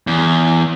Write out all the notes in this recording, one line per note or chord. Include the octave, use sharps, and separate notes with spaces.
E2